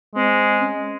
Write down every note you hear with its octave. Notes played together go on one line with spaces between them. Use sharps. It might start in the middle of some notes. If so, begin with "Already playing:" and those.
G#3 C4
C#4